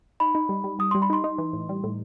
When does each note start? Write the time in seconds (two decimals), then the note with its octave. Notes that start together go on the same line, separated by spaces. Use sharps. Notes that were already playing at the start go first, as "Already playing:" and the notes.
0.20 D#4 B5
0.35 D#4
0.49 G3
0.64 G3
0.79 G3 D#6
0.91 G3 C6
1.02 B5
1.10 D#4 C6
1.24 D#4
1.38 E3
1.53 A2
1.69 G3
1.84 A2